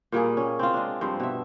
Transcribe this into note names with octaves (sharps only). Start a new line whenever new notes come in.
A#2 G3 A#3 G#4
C#4
C4 F4
G#3 D4
G2 F3 C4
B2 E5